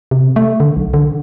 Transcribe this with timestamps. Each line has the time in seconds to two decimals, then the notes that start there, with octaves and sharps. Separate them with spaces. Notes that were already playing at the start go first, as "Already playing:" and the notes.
0.11 C3
0.36 A3
0.60 D3
0.77 B1
0.94 D3